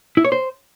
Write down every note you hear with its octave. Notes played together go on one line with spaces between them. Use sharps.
E4
C#5
C5